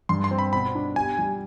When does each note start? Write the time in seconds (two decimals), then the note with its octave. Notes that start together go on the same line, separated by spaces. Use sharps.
0.09 G2 C6
0.24 C6
0.31 C4
0.39 B5
0.53 B2 B5
0.75 D4
0.96 G4 G#5
1.18 G3